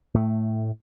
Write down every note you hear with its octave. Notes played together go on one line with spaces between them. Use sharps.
A2 A3